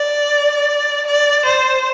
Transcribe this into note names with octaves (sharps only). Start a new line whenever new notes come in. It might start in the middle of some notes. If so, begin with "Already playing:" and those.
Already playing: D5
D5
C5